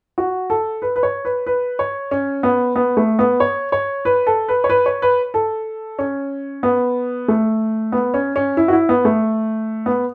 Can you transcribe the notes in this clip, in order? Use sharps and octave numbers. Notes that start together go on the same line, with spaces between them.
F#4
A4
B4
B4
C#5
B4
B4
C#5
C#4
B3
B3
A3
B3
C#5
C#5
B4
A4
B4
C#5
B4
C#5
B4
A4
C#4
B3
A3
B3
C#4
C#4
E4
F#4
E4
B3
A3
B3